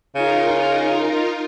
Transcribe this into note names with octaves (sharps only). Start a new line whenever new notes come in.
C#3 D#4 F4 A#4